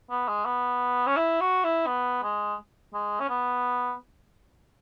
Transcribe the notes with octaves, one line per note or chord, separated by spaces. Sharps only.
B3
G#3
B3
C#4
E4
F#4
E4
B3
G#3
G#3
C#4
B3